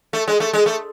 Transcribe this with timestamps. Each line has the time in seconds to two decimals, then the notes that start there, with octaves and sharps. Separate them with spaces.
0.13 A3
0.28 G#3
0.40 A3
0.53 G#3
0.66 A3